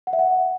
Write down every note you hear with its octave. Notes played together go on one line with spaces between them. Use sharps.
F#5
E5
F#5